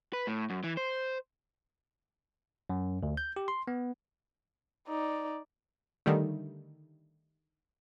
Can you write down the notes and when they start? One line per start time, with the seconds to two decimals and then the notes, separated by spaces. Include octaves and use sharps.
0.13 B4
0.27 A2
0.50 F#2
0.64 E3
0.77 C5
2.69 F#2
3.03 D2
3.17 G6
3.36 G4
3.48 C6
3.68 B3
4.87 D#4 D5
6.06 D3 D#3 G3 A3